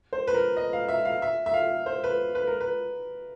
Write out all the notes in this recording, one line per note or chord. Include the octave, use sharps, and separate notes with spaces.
C5
B4
A#4
D#5
F5
E5
F5
E5
E5
F5
C5
B4
B4
A#4
B4